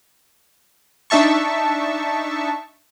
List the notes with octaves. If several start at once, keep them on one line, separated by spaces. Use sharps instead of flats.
D4 D#4 E5 A5 C#6